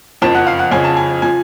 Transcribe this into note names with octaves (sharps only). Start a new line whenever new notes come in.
F#1 F2 F3 A5
F#5
F5
F#5
F2 C#3 F3 G#5
A5
G#5
F3 G#5